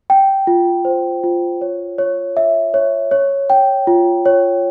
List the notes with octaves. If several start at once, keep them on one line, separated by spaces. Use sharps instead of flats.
G5
F4
C5
F4
C#5
C#5
E5
C#5
C#5
G5
F4
C#5